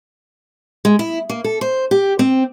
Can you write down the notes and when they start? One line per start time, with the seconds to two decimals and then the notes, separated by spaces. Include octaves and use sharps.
0.85 G#3
0.99 E4
1.30 A#3
1.44 A4
1.61 C5
1.91 G4
2.19 C4